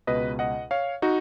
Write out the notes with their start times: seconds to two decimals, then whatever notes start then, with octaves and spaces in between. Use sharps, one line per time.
0.07 C#2 B2 B4 D#5
0.39 D#5 F#5
0.71 C#5 F5
1.02 D#4 F#4